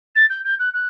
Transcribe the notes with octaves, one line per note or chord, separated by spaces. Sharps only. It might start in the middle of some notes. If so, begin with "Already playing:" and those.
A6
G6
G6
F#6
F#6